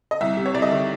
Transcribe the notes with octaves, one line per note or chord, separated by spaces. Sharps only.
D#5
C2 E5
C3
C#5
C2 D5
D#5
D#3 E5